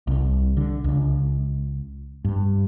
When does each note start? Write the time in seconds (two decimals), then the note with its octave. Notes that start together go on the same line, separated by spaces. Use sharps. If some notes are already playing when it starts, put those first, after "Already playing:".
0.07 C2
0.57 D3
0.84 C#2
2.25 G2